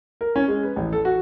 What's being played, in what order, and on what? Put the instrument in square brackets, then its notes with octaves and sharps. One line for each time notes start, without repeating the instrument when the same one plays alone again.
[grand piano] A#4
C#4
G#3
B4
A1
A4
F#4